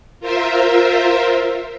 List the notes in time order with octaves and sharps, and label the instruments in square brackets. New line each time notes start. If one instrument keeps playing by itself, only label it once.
[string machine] F4 A#4 C5 E5